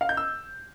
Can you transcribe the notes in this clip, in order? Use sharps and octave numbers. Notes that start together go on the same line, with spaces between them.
F5
G6
E6